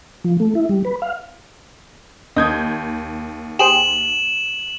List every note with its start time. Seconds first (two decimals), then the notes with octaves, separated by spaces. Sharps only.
0.24 F3
0.40 A3
0.55 E4
0.69 G3
0.85 B4
1.02 F5
2.36 D#2 D#5 G6 G#6
3.59 G4 G#4 C5 E7 F#7